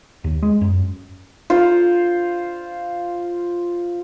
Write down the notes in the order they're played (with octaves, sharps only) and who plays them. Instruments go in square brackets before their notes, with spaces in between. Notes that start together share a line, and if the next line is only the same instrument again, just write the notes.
[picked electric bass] D#2
G#3
F#2
[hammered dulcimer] F4 C5